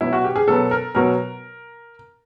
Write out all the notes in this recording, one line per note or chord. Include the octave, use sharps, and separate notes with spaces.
B2 F#3 B3 E4
F#4
G4
G#4
B2 F#3 B3 A4
A#4
B2 F#3 B3 A#4